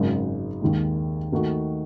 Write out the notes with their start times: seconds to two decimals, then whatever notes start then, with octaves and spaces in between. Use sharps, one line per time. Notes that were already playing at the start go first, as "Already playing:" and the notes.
Already playing: G#1 F#2 C#3 G#3
0.62 D#2 D#3 G#3 D#4
1.32 D#2 D#3 A3 D#4 F#4